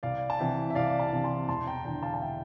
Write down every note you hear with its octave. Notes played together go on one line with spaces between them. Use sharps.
C2 D5 F5
A5
C3 E3 E5 G5
E5
C2 D5 F5
F5 A5
C3 E3
A5 C6
E1 A5 C6
G5 A#5
E2 D3 G5 A#5
F5 A5
A5
E5 G5